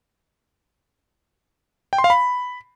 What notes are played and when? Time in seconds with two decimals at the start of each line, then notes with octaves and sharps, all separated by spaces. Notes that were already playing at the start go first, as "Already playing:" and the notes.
1.93 G5
1.98 C6
2.04 F5
2.10 B5